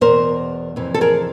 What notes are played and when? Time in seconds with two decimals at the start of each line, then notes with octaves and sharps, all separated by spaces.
0.01 E2 B2 A#4 C5
0.76 F2 C3 E3
0.94 A4
1.01 G#4 A#4